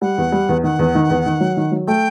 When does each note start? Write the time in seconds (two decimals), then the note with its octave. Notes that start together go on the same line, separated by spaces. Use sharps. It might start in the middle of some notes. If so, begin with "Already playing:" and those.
0.02 G3 F#5
0.18 E2
0.32 G3
0.49 E2
0.64 D#3 F#5
0.79 E2
0.95 D#3
1.10 E2
1.26 D#3
1.41 F#3
1.57 D#3
1.72 F#3
1.87 A3 G5